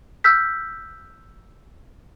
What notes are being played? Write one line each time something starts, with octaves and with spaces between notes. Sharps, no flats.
E6 F6 G6 B6